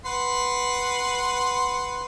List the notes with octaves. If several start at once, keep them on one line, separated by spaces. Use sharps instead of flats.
B4 F#5 C6